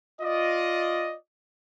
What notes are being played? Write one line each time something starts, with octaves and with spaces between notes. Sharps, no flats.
F4 D5 D#5